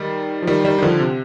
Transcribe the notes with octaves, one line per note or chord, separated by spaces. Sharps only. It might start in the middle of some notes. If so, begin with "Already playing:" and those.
Already playing: D#3 G3
F3
D#3 G3
D#3 G3
D#3
D3 F3
C3